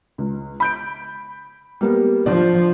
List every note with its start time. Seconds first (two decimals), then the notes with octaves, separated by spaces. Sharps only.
0.18 C#2
0.60 B5 G6 D7
1.81 G3 A#3 B3
2.26 F3 D4 D5